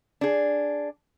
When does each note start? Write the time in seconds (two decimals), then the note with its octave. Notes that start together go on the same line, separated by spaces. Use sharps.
0.21 D4 G#4